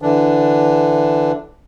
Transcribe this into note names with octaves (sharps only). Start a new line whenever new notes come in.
D3 E3 D4